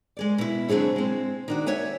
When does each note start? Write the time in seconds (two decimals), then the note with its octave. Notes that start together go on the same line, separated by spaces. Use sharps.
0.17 G#3 G#4 D5
0.38 B2 E4
0.68 D3 F#3 C4 G#4 C#5
0.96 G#3 C4
1.48 D#3 D4 F#4
1.66 C#5 E5 F#5 G#5